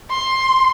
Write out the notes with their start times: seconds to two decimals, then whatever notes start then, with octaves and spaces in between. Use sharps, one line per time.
0.10 C6